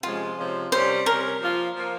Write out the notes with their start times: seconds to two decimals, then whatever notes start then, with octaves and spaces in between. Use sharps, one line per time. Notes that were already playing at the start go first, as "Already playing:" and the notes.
0.03 C3 F3 G#3 C#4 F4
0.38 C3 F3 G#3 C#4
0.72 C3 G3 C#4 C5
1.06 C3 G3 C#4 A#4
1.41 F3 A#3 F4
1.75 F3 A#3 F4